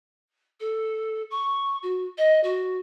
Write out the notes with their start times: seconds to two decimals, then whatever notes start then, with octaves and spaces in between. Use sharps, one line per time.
0.60 A4
1.30 C#6
1.83 F#4
2.17 D#5
2.43 F#4